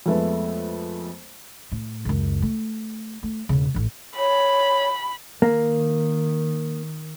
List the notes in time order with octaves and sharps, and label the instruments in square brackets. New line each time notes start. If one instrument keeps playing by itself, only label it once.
[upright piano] F2 G#3 A3 B3
[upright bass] A2
C#2 F#2
A3
A3
E1 C#3
A1 F3
[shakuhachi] C#5 [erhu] B5
[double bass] D#3 [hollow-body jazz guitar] A#3